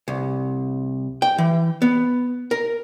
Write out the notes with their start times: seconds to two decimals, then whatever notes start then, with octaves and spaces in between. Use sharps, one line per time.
0.08 C2
1.22 G5
1.38 E3
1.82 B3
2.51 A#4